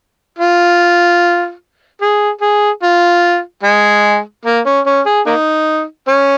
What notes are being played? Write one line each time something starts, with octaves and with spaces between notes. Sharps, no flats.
F4
G#4
G#4
F4
G#3
A#3
C#4
C#4
G#4
A#3 D#4
C#4